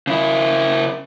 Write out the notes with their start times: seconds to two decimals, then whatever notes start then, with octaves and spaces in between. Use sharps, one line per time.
0.07 C#3 E4